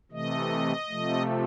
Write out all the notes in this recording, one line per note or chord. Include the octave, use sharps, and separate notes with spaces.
C3 E3 A3 D#5
C3 F3 A3